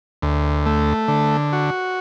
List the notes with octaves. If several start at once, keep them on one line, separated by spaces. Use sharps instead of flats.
D2
A3
D3
F#4